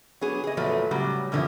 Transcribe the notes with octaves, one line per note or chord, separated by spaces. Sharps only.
F#3 B3 G#4
G#4 D#5
E2 A#2 F3 F#3 A3 B4
A2 C#3 F#3 G3
F#2 B2 D3 E3 F3